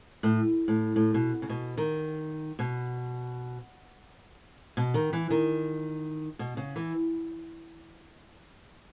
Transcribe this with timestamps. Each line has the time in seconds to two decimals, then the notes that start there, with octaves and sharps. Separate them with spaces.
0.23 A2
0.68 A2
0.96 A2
1.14 B2
1.42 C#3
1.49 B2
1.78 D#3
2.59 B2
4.77 B2
4.94 D#3
5.13 E3
5.30 D#3
6.39 B2
6.57 C#3
6.76 E3